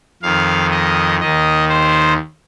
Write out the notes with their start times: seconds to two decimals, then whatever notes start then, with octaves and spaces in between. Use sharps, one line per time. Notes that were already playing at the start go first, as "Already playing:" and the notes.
0.22 F2 D#3 F5
0.71 D#5
1.21 D#2 D#3 D#5
1.69 C5